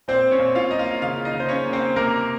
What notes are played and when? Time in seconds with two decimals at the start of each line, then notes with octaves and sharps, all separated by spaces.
0.08 A#2 C4 C5
0.31 C#4 C#5
0.39 A#2
0.55 F4 F5
0.71 A#3 D#5
0.79 F4 F5
1.02 C#3 F4 F5
1.25 D#4 D#5
1.34 C#3
1.40 C5
1.49 C#4 C#5
1.66 A#3
1.73 C4 C5
1.96 C3 A#3 A#4